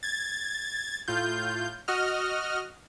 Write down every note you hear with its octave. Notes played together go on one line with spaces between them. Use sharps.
G#6 A6
A2 F4 G6
F#4 D#5 F6